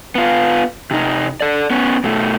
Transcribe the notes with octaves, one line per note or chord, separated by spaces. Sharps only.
B3 F4
C3 D#4
A4 D5
B3 C#4
B2 A3